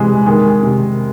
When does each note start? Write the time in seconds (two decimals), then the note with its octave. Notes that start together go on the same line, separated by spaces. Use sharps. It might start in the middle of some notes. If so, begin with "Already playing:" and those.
Already playing: C3 E3 G#3
0.26 D#3 G#3
0.63 C3